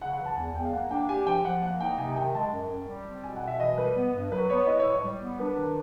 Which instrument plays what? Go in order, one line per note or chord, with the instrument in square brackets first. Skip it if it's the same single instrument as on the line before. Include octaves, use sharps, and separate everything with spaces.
[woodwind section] C#3 [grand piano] F#5
[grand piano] F#5
[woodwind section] E3
[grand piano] A5
[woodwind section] E2 [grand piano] G#5
[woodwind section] E2 [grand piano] G5
[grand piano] F5
[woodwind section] A#3 [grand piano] F#5
[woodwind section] D4 [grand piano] G5
[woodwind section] G4 [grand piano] G#5
[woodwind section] F3 [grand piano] G5
[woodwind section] F3 [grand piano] F#5
[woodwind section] A#3 [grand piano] F#5
[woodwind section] D#4 [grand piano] G5
[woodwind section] C3 [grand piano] G#5
[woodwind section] D#3 [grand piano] G5
[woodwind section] G#3 [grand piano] A5
[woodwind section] F#2
F#2
G3
C4
[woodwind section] B2 [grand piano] G#5
[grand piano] F#5
[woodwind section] B2
[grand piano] E5
[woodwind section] E3 [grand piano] D#5
[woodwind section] G3 [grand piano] B4
[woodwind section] B3
G2
[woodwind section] F#3 [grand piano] B4
[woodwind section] B3 [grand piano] C#5
[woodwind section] E4 [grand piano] D#5
[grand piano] C#5
[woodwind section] A2
[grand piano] C#5
[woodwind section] G3
B3
[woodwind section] D4 [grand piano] B4
[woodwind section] D#3 [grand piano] A#4